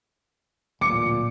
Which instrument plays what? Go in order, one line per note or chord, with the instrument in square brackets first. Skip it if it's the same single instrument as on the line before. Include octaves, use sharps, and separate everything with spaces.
[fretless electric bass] D1 A1 [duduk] A#2 [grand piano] D6 C#7